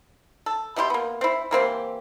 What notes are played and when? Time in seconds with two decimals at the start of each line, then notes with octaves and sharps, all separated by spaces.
0.46 A4
0.76 B2 E4 G4 C6
0.90 A#3 B3
1.21 C4 E4
1.51 E3 A#3 C4 G4